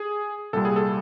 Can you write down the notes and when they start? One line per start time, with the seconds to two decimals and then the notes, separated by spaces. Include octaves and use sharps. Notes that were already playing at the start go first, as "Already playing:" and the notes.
Already playing: G#4
0.53 C2 A#2 G3 A4
0.65 G#4
0.76 A4